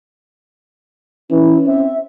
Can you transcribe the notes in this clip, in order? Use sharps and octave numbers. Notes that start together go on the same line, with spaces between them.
E3 C#4 E4
C4 E5